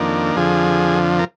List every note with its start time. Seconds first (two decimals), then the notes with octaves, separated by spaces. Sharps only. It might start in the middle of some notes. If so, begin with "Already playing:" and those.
Already playing: F2 D#3 A#3 D4
0.36 F2 D3 F3 G#4
1.19 A#4